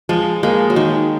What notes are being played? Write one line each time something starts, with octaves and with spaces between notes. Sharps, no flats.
F3 G#3
G#3 A#3
F#3
D#3 G#3